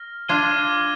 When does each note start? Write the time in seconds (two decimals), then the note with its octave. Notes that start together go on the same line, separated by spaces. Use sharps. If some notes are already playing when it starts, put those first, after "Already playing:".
Already playing: F6 A#6
0.28 D4 F4 D6 G#6 D#7 G7